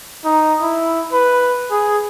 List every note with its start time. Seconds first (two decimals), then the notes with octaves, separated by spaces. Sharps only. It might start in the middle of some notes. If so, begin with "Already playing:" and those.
0.25 D#4
0.62 E4
1.12 B4
1.71 G#4